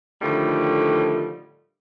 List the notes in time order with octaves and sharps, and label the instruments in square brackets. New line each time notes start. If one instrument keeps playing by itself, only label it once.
[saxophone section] A2 D3 D#3 F3 G3 A3